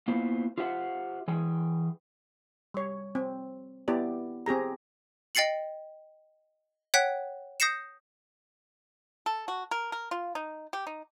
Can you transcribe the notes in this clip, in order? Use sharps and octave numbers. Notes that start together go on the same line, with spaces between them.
A#3 B3 E4 F4 C5
F4 G4 C5 E5 F#5
E3 G#4 G5
G3 C#5
C4
B3 E4 G4 D5
C4 G4 G#4 A#5
D#5 G5 A6 C7 C#7 F#7
C#5 F#5 G5 F#6 B6
D#6 G6 A#6 C7 C#7 E7
A4
F#4
A#4
A#4
F4
D#4
G4
D#4